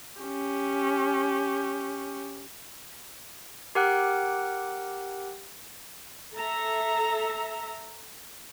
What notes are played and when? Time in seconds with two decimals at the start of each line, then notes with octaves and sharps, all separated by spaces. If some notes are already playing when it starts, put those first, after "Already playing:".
0.21 C#4 G4
3.75 G4 A#4 F#5 G5 F#6
6.35 A4 E5 A#5